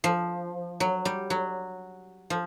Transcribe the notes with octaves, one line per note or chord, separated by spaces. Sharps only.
F3
F#3
G3
F#3
F3